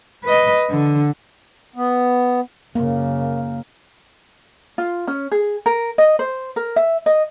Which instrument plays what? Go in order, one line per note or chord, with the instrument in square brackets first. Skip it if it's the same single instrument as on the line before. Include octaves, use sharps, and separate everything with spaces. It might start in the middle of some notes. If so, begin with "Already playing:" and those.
[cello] B4 D#5
D3
[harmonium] B3
[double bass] F#2 C#3 [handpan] A#3
[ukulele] F4
C#4
G#4
A#4
D#5
C5
A#4
E5
D#5